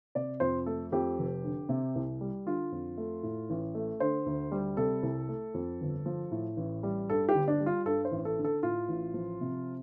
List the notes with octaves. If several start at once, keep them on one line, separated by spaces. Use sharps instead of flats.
C3 D5
F2 C5
A3 A4
F2 G4
F1
D3
C3
C2
G3
D3 F4
F2
A3
A2
A1
A3
D3 C5
D2
G3
C3 A4
C2
A3
F2
G1
F3
A2
A1
G3
G2 A4
G4
G1
D4
G3
F4
G2 A4
C5
A1
A4
D3
A4
A2 F4
A1
F3
C3